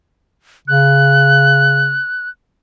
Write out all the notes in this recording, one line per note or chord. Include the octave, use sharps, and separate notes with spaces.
C#3 F#6